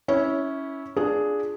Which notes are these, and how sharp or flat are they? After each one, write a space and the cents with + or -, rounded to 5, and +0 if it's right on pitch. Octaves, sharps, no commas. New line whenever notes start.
C#4 +0 E4 -20
D4 +0 F4 +0 G#4 +5